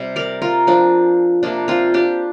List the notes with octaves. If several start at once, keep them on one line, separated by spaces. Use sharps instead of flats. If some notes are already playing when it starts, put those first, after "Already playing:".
Already playing: C3 G3 C4
A#4 D5
F4 A#4
F3 C4 D4
C3 F3 A#3 D4
C4 F4
D4 G4